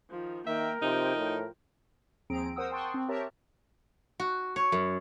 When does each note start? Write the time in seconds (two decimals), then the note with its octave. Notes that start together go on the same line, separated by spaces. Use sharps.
0.11 D#3 F3
0.47 D#3 A#3 A#4 E5 G5
0.82 C3 F3 D#4 G5
1.17 A2
2.30 D#2 F3 C4 G#4 A#5 D7
2.56 A#4 C5 F#5 D#6 E6
2.71 G5 A5 C6 C#6 D#6 F#6
2.94 C4
3.09 G4 A#4 C#5 E5 A5 A#5
4.20 F#4
4.56 C#5
4.72 F#2